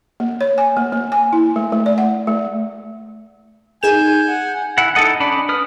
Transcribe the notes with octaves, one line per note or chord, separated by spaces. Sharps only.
A#3
C#5
G#5
A#3
A#3
G#5
E4
A3
A3
D5
F#5
A3
D#4 G#4 G#5 G6 E7
F#5
E4 F#5
D#4 E4 A4 D#5 F#5
C#4 D4 D5 B5
B4 D#6 F6